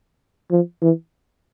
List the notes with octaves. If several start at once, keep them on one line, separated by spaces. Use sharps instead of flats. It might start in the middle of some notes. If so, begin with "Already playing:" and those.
F3
E3